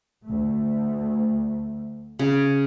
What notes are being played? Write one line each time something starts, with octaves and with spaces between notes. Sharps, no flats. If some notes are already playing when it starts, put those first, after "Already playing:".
D2 A3
C#3